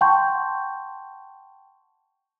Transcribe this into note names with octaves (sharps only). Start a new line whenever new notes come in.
F#5 G5 A5 C6 C#6 G6